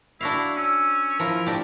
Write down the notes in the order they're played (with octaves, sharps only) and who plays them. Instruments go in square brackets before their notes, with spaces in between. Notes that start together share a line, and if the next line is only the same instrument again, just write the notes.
[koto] D4 F#4 F5 [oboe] E4
[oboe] C#4 [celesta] E6
[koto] F3 E4 [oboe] A#4
[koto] D4 G4